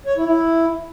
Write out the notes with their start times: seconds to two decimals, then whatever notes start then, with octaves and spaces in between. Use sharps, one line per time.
0.06 C#5
0.17 E4
0.27 E4